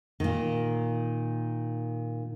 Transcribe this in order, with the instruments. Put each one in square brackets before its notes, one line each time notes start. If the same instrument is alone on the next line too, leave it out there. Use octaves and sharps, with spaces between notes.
[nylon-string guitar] A#2 D#3